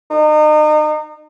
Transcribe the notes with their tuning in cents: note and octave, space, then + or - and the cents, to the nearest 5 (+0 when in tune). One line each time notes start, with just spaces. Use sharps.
D#4 -35